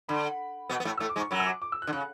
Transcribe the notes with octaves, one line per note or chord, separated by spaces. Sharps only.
D3 B5
B2 B3
B3
A2 A3
A2 A3 E6
D6
G#2 G#3
C#6
F#2 F#3 B5
E6
D6
D6
E6
F#6
D3
C#3 F#6